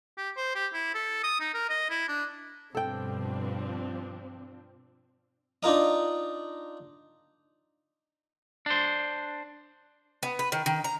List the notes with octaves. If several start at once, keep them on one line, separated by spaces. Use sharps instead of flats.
G4
C5
G4
E4
A4
D#6
D#4
A#4
D#5
E4
D4
G2 B2 F3 C4 D4 A4 G5
D4 D#4 F4 A#4 D#5
D4 C5
B3
B4
D#3
D#3
A#5